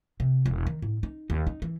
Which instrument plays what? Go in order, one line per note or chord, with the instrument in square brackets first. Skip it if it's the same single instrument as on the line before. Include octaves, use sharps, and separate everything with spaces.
[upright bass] C3
E1
D#3
A2
D#4
D#2
D#4
E3